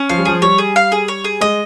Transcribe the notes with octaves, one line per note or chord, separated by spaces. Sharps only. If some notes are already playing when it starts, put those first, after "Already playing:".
Already playing: C#4
F3 F5
G3
F3 G#4
G3 C#5
G#4
F5
G#4
C#5
G#4
G#3 D#5